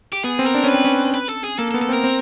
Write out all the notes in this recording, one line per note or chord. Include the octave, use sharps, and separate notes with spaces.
G4
B3 G#4
C4
A#4
D4
C#4 B4
C4
C#4
B4
A4
G#4
A#3 A4
A4
B3
A4
C4 A#4
C4